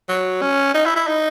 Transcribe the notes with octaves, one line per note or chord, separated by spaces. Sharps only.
F#3
C#4
D#4
E4
E4
D#4